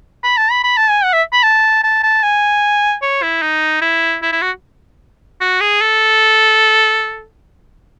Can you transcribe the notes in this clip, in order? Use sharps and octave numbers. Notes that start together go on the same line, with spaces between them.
B5
A5
B5
B5
A5
G#5
F#5
E5
B5
A5
A5
A5
G#5
C#5
E4
D#4
E4
E4
E4
F#4
F#4
G#4
A4